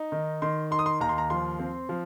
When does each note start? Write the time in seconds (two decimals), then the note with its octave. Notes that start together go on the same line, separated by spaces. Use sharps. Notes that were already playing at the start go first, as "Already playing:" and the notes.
Already playing: D#4
0.12 D#3
0.42 D#3 C6
0.71 D#4 C6
0.79 D#6
0.86 C6
1.00 D#2 A#5
1.09 C6
1.18 A#5
1.30 F3 C6
1.59 C4
1.89 F3